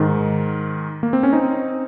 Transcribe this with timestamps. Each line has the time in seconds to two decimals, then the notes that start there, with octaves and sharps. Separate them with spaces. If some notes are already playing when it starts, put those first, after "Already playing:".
Already playing: G#2 D#3
1.03 A#3
1.13 C4
1.23 C#4
1.33 C4 D#4